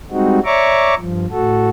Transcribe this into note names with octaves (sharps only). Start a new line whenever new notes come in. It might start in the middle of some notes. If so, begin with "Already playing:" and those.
G3 G#3 C4 D#4 F#4
C#5 D5 E5 A#5 C#6 D6
G2 F3
A2 F#4 A4